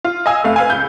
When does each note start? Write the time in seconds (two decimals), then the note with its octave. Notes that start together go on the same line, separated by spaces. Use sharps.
0.04 F4
0.26 D#5 F5 G#5 E6
0.44 F1 A3 F5
0.56 B4 F5 G#5
0.70 C#2 G6